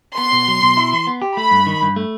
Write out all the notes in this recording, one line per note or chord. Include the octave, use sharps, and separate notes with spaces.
B3 C6
B2
F#3
B2
E4
E3
B3
G4
A3 B5
G2
D#3
G2
A3